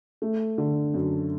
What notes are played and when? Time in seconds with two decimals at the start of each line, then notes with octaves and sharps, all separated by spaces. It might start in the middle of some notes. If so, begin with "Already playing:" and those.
0.22 A3
0.58 D3
0.94 F#2